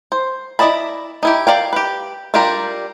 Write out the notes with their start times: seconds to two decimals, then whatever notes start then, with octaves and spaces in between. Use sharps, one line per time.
0.12 C5
0.59 E4 D5 D#5 A5 B5
1.23 D#4 E4 G4
1.47 A#4 D5 F5 G5
1.73 G4 B4
2.34 G3 D4 F4 G4 A#4